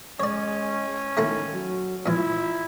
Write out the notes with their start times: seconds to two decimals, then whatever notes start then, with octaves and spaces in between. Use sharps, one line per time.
0.20 G#3 C#4 C#5 D5
1.17 D#3 A3 A#3 E4
1.52 F#3
2.06 A#2 E3 E4 F4